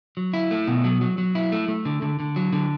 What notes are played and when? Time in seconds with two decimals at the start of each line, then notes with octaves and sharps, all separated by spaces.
0.17 F#3
0.34 E4
0.51 A3
0.68 B2
0.84 F#3
1.01 F#3
1.18 F#3
1.35 E4
1.52 A3
1.68 A3
1.85 D3
2.02 D3
2.20 D3
2.36 F#3
2.53 D3